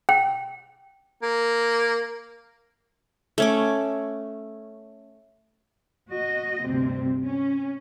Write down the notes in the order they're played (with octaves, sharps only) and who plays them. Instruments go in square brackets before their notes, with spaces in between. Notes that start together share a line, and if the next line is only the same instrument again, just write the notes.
[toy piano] G5
[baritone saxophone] A#3
[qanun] A3 C#4 D6
[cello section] F#4 D#5
D2 G2 C3 C4
C#4